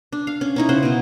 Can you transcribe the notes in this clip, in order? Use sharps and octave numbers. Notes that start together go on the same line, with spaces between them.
D4
F5
C#4
C#4 D#4 E4
C#3 C5 F#5
B2 E4